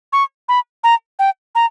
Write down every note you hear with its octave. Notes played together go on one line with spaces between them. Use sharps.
C#6
B5
A#5
G5
A#5